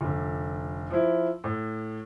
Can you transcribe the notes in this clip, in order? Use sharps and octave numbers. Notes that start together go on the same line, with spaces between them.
F1 D3
F3 E4
A2